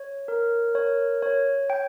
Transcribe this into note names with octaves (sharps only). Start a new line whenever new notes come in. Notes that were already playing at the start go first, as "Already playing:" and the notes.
Already playing: C#5
A#4
C#5
C#5
G5